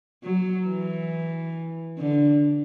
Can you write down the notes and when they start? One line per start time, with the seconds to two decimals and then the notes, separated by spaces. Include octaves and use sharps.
0.24 F#3
0.67 E3
1.99 D3